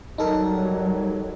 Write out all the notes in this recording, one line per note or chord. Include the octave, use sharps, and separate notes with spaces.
F#3 G3 D#4 A4 A#4